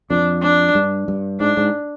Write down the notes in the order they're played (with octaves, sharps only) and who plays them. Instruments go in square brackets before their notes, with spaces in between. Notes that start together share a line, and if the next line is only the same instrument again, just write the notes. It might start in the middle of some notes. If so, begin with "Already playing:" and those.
[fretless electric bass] F2 [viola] D4
[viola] D4
[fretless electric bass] G2
G2
[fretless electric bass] G#2 [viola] D4
[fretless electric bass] G#2